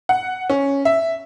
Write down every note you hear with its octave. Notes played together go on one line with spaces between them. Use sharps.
F#5
C#4
E5